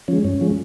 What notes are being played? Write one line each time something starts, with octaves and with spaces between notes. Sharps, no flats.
F3 G#3 C#4
G2 C#4
F3 G#3